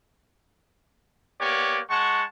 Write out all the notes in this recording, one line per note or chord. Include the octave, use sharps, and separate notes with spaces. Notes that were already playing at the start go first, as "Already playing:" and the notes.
A#3 B3 G4 C#5 D5
G#3 F#5 A5 C#6